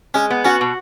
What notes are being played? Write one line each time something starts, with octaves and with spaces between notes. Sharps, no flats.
G#3 C#4
B3
C#4 F#4
B2